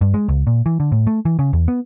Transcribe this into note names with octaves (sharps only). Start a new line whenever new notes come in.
G2
G#3
C#2
A#2
E3
D3
A2
A3
E3
C#3
E2
B3